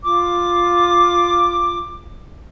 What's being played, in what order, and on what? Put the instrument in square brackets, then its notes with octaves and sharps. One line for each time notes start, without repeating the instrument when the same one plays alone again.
[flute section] F4 D6